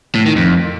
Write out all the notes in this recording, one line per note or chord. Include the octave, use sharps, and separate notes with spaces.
A2
D#3
F2